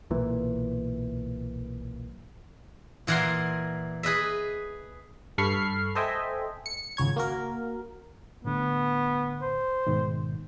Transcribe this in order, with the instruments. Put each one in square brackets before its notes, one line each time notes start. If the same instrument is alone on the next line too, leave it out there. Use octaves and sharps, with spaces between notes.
[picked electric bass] B1 A#2 E3
[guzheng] A#2 E3 A#4 F#5 G#5 C6
G#4 B4 D#5 E5
[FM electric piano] G2 A4 B5 C#6 F6 C7
A4 C5 D#5 E5 G5 G#5
C#7
G#1 C#2 C#5 G#6
A#3 F#4 A#4
[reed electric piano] A2 D3 [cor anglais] B3
[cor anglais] C5
[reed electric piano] G#2 B2 D#3